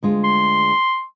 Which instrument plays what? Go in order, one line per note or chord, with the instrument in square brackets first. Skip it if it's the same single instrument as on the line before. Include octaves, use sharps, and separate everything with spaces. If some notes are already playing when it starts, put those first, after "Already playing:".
[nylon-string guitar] D2 G#3 F4
[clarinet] C6